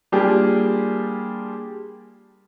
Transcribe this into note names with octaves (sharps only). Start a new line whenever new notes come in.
G3 A#3 D4 F4 G4 G#4